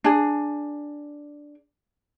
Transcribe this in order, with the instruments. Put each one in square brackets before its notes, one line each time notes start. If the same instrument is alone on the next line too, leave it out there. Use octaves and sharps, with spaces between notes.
[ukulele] D4 G#4